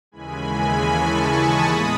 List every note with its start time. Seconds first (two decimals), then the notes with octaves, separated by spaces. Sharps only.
0.12 D#2 C#3 E3 G#3 G#5 B5
0.89 A5 C#6
1.28 B5 D#6
1.66 A2 G#3 B3